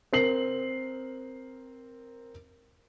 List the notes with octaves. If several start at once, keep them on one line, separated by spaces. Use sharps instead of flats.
C4 A#4 C7 F#7